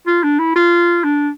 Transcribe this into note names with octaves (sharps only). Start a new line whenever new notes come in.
F4
D4
E4
F4
D4